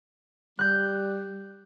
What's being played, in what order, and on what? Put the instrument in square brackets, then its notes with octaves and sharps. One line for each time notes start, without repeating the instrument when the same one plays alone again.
[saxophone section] G3 [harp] F#6 G6